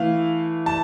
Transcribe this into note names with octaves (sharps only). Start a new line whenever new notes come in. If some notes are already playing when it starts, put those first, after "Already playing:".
Already playing: E3 A3 E4 F5
A5